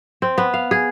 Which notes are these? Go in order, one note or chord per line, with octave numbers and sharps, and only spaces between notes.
C4
B3
F5
G#4